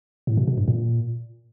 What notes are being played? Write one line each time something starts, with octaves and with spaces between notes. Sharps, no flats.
A2
B2
B2
G2
A#2